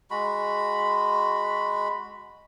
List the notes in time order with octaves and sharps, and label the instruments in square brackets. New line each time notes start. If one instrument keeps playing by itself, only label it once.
[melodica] G#3 F#4 B5